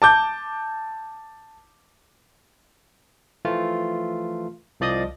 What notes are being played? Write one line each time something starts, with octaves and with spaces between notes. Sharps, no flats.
A5 D6 G6
E3 F3 A3 F4
C2 F3 D5 D#5 D#6